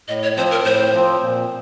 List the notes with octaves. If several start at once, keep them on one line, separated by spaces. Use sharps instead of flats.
A2 D#5
C#5
F3 C4 C5
A#4
A2 C5
F3 C4
A#2